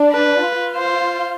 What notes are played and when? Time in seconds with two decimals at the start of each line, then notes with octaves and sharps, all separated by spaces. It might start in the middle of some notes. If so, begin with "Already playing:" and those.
Already playing: D4
0.12 B4
0.43 F4
0.75 C5